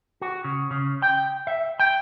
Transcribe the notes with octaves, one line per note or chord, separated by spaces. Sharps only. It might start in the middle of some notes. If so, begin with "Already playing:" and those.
F#4
C#3
C#3
G5
E5
G5